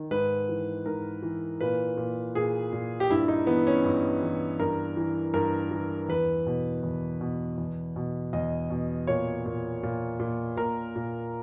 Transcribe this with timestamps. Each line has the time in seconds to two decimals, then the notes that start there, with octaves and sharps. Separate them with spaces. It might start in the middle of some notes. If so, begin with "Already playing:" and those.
Already playing: D#3
0.11 G#2 B4
0.49 E3
0.86 G#2 A#4
1.23 E3
1.61 A#2 B4
1.97 A#2
2.35 A#2 G#4
2.73 A#2
3.00 G4
3.10 G2 E4
3.28 D#4
3.47 E3 B3
3.67 C#4
3.84 G2
4.22 E3
4.59 G2 A#4
4.97 E3
5.34 G2 A#4
5.71 E3
6.09 E2 B4
6.46 B2
6.83 E2
7.21 B2
7.58 E2
7.96 B2
8.33 E2 D#5
8.70 B2
9.07 A#2 C#5
9.46 A#2
9.83 A#2
10.20 A#2
10.57 A#2 A#4
10.96 A#2